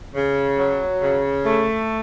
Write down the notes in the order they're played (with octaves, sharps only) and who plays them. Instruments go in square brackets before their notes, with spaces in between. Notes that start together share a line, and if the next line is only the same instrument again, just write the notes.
[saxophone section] C#3
F#3
C#3
A3